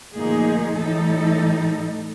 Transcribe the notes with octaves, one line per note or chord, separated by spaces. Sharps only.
D2 A#2 F3 A#3 D#4 G#4
A2 E3 G3 D#4 A4